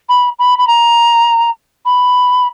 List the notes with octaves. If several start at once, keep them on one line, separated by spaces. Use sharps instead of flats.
B5
B5
B5
A#5
B5